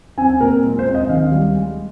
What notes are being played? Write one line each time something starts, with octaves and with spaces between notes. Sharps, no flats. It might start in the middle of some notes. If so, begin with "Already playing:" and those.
C4 G#5
A#2 A#4
G#3
C5
C4
D#5
D#3 F5
G3
G#3